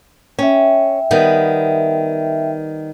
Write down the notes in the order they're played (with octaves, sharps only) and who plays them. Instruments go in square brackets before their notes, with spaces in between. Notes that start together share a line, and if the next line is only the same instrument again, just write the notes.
[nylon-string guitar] C#4 [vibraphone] E5 G5
[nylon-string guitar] D#3 G3 B3